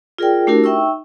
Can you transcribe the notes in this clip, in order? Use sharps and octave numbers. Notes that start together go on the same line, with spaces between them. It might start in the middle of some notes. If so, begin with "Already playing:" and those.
F4 G#4 A#4 D5 G5
A3 D4 E4 F#4 G4 A#4
D#4 E5 G5 C#6 E6